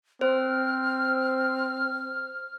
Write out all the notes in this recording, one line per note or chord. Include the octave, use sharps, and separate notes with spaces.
C4 C5 F6